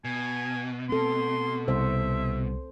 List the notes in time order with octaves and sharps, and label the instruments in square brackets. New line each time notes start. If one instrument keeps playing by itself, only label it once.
[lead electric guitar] B2 [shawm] G#5
[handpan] C4 A4 [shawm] C6
[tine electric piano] C2 [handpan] C5 [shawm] E5